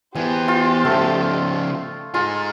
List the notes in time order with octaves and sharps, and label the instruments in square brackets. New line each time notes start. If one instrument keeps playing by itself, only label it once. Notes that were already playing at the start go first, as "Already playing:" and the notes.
[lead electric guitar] E3 B3 [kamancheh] G4 C5 [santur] G#5
[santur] F4
[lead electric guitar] C#3 F3 [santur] A3
[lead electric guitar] D#4 G#4 [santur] F4